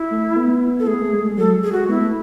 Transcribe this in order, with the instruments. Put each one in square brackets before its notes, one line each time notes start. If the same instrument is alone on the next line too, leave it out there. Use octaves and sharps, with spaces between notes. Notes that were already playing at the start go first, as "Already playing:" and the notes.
Already playing: [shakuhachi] E4
[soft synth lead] A3
A3
B3
[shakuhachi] A4
[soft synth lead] A3 [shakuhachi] G#4
[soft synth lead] B3
A3
G#3
A3
G#3
[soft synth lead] F#3 [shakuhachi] A4
[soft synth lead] G#3
[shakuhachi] G#4
[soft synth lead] G#3 [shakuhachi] F#4
[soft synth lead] B3 [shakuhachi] E4
[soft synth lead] A3